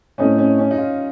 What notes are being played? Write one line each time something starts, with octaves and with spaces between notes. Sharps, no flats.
A2 A3 C4 C#4 D#4
C#4
C#4
D#4
F4